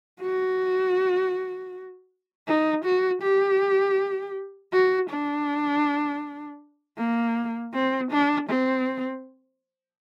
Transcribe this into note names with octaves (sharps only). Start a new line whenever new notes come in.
F#4
D#4
F#4
G4
F#4
D4
A#3
C4
D4
C4